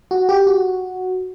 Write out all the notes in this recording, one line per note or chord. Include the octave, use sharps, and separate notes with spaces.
F#4
G4
F#4